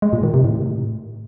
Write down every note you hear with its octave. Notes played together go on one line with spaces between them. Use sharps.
G#3
A#2
D#3
C3
A2